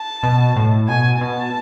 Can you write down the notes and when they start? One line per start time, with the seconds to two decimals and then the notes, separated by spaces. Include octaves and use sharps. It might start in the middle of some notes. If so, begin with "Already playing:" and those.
Already playing: A5
0.23 B2
0.56 A2
0.88 B2 G#5
1.21 B2 A5